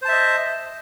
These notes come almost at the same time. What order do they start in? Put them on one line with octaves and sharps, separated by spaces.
C5 A5 E5 D#5